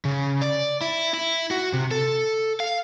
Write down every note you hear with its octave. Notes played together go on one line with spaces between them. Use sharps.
C#3
D5
E4
E4
F#4
C3
A4
F5